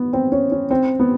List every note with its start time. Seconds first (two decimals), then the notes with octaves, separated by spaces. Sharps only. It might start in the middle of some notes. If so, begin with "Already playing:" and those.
Already playing: B3
0.13 C4
0.32 C#4
0.52 C#4
0.71 C4
0.99 B3